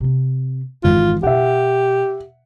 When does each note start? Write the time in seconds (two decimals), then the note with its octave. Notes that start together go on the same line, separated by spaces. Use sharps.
0.01 C3 C4
0.84 G#1 F2 E3 F4
1.23 B2 G4 E5 F#5